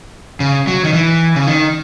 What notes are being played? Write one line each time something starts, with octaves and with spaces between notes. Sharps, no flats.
C#3
F#3
D#3
E3
C#3
D#3